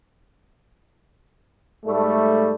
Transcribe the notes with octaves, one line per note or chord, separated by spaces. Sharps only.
G#2 G3 A3